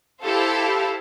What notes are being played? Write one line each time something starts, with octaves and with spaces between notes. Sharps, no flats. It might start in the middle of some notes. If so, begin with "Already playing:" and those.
E4 G4 A4 C5 F5